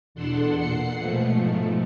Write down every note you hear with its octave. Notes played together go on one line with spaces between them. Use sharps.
E2 B2 D4 A4 F#5 C6
A#2 F#5 C7 C#7
G#2 B2 F3 A3